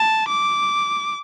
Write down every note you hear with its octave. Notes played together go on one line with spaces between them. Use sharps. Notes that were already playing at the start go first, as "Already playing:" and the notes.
Already playing: A5
D6